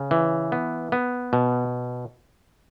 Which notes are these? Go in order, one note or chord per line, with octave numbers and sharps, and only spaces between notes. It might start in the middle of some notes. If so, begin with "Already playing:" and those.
Already playing: C#3
E3
B3
B3
B2